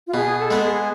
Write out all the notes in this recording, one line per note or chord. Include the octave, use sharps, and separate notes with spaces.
F4
B2 G#4
A4
G#3 B3
G#4